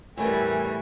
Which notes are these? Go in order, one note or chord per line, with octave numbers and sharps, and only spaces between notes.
E2 A2 E3 G3 A3 A#4 G#5